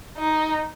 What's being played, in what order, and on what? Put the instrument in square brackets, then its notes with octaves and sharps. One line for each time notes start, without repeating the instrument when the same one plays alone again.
[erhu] D#4